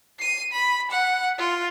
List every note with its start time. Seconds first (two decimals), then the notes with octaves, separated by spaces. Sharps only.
0.19 C7 D#7
0.52 B5
0.91 F#5
1.38 F4